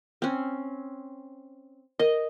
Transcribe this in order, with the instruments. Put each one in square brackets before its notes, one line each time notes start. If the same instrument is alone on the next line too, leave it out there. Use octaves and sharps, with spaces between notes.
[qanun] C4 C#4
[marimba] A#4 [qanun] D#5